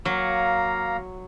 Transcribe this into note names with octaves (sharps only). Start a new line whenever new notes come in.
F#3 A#3 F5 A#5